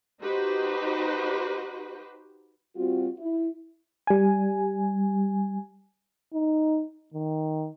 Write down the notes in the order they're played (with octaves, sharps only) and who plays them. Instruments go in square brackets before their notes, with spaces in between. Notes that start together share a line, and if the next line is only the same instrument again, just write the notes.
[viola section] D#4 F#4 G4 B4 C5
[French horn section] G3 C4 F4 F#4
E4
[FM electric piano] G3 G#5
[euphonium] D#4
D#3